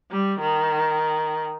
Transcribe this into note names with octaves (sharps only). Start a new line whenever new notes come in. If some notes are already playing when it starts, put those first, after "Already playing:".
G3
D#3